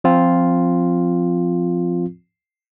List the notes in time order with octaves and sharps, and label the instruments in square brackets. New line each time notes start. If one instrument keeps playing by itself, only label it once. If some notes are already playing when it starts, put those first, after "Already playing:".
[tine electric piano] F3 C4 F4